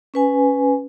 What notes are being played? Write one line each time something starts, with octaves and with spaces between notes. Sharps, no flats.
C#4 B4 G#5